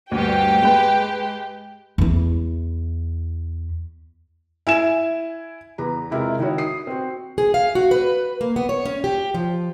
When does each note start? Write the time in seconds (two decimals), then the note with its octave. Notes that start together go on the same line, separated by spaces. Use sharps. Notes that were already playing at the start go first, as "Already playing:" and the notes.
0.11 D2 G2 G4 G5
0.62 G#3 B4
1.98 E2 E4
4.67 E4 G#5 E7
5.78 E2 B4 A#5
6.11 C3 G#3 E4 F4 A#4
6.39 D#3 D#4 E4 F#4 C#5
6.58 D#6 C7
6.87 C4 F#4
7.38 G#4
7.54 F5
7.75 F#4
7.91 B4
8.41 A#3
8.56 B3
8.69 C#5
8.85 C#4
9.04 G4
9.34 F3